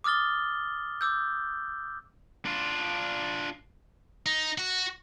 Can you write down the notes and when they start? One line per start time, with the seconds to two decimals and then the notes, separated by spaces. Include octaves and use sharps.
0.04 D6 D#6 F6 A6 G7
1.01 D6 E6 G6
2.46 D4 F4
4.26 D#4
4.58 F#4